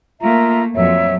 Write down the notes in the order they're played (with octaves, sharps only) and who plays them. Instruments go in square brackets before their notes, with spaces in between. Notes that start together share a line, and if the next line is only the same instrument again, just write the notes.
[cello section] A3 A#3 [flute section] F4 E5 A#5
[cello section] F2 A#2 F#3 [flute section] C#5 E5